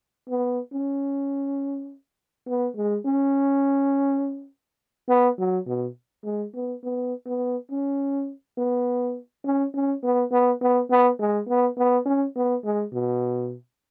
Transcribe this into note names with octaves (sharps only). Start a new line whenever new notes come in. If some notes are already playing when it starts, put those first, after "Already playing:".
B3
C#4
B3
G#3
C#4
B3
F#3
B2
G#3
B3
B3
B3
C#4
B3
C#4
C#4
B3
B3
B3
B3
G#3
B3
B3
C#4
B3
G#3
B2